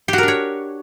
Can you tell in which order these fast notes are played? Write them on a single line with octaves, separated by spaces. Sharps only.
G4 F#4 A#4 D4 C#5